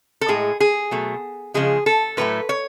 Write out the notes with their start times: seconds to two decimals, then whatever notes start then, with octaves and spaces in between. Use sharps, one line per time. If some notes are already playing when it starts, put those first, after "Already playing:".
0.21 A4
0.28 A2 G#3 G#4
0.60 G#4
0.91 B2 F#3 A3
1.54 C#3 F3 G#3 G#4
1.86 A4
2.17 A2 F#3 A3 B4
2.49 C#5